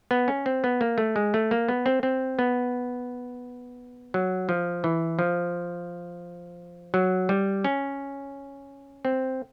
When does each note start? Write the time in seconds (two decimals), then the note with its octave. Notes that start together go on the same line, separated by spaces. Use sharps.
0.11 B3
0.28 C#4
0.46 C4
0.64 B3
0.81 A#3
0.98 A3
1.16 G#3
1.34 A3
1.51 A#3
1.69 B3
1.86 C4
2.03 C4
2.39 B3
4.14 F#3
4.49 F3
4.84 E3
5.19 F3
6.94 F#3
7.29 G3
7.64 C#4
9.05 C4